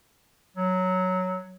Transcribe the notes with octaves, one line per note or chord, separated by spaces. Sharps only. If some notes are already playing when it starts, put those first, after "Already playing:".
F#3